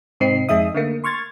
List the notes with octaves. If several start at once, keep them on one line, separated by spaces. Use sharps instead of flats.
G#2 C3 C4 D#4 C7
F2 G#3 D#4 E5 D#6
D3 A3 A#3
C6 C#6 F6 G#6 A6